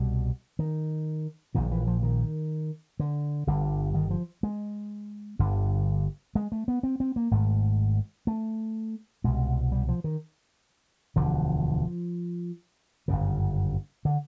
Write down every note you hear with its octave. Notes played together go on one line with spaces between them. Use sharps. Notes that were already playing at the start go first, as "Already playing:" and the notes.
Already playing: C2 B2 G3
D#3
A#1 A#2 D#3
E3
F3
D#3
D3
G1 G2 D3
D#3
F3
G#3
G1 G2 D3
G#3
A3
B3
C4
C4
A#3
G#1 G#2 A3
A3
C2 B2 G#3
G3
F3
D#3
E1 D2 D3 F3
G1 F#2 C#3
D3